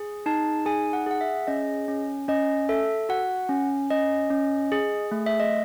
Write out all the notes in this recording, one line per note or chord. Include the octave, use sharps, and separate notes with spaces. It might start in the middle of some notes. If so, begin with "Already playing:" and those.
Already playing: G#4
D#4 A5
G#4 G#5
F#5
G#4 F#5
E5
C#4 D#5
C#4
C#4 D#5
A4 E5
F#4 F#5
C#4
C#4 D#5
C#4
G#4
A3
E5
D#5